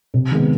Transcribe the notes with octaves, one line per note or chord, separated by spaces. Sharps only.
C3
D#3 G#3 B3